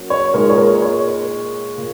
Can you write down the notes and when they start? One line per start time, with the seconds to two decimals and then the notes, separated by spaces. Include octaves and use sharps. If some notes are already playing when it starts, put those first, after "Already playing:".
Already playing: F#3 A#3 C#4
0.10 C#5
0.34 A#2 G#3 D#4 A#4
0.50 C#5
0.58 A#4
0.82 C#5
1.78 A#2